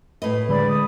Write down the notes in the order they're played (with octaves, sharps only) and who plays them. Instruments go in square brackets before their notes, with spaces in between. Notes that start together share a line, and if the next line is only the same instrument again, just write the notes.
[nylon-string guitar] A2 B4 D#5
[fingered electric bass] D3 G#3 [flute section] D5 B5
[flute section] D#6